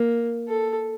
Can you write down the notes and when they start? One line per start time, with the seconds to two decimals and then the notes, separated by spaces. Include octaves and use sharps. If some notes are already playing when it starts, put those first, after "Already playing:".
Already playing: A#3
0.48 A4